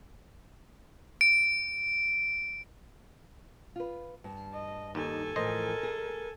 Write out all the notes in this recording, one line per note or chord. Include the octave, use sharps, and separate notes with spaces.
D7
F4 B4
G2 A5
D#5
D#2 D#4 A4 G#5
A2 E3 F3 A#4 C5 D#5
G#4